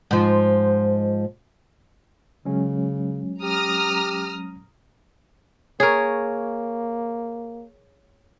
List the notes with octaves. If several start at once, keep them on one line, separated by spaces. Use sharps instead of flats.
G#2 F3
C#3 F#3 G#3 C#4
G4 A#5 D#6 F6
A#3 G#4 A#4 C#5